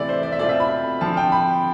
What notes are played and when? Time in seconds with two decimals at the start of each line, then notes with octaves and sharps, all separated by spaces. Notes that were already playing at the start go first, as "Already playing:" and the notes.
Already playing: C3 E3 A3 D5 E5
0.09 C5
0.23 D5
0.32 E5
0.39 B2 A3 C4 F4 D5
0.49 E5
0.60 B5
1.01 D3 F3 C4 A5
1.17 G5
1.32 B5